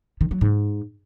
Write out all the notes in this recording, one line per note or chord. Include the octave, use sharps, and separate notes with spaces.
D#3
F#3
G#2